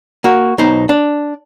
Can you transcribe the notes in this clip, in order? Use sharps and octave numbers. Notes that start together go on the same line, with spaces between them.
A#3 F#4
B1 B2 D#4 C5
D4